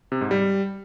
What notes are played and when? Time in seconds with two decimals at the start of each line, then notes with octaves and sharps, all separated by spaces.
0.12 C3
0.21 G#2
0.31 G3